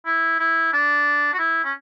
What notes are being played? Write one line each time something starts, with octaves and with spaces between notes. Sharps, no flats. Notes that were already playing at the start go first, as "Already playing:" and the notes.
E4
E4
D4
F#4
E4
C#4